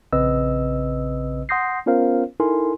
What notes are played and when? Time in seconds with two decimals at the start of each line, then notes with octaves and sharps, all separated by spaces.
0.13 A#1 C#3 C4 B4 D#5 E6
1.49 F#5 C6 D#6 G6 A#6 C7
1.86 B3 C#4 F4 A#4 C5 F5
2.40 D#4 E4 A4 A#4 G#5 C6